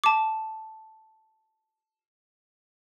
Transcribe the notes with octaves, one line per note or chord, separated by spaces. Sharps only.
A5 D6